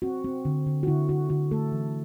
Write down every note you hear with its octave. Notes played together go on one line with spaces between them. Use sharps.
C4 F#4
C4
D3
D3
F#4
D3 E4
D3 F#4
D3 F#4
A3 A4
E3